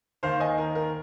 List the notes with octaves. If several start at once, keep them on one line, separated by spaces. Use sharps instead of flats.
D#2 D#3 C5 F5
D#5 G#5
A#4
A#4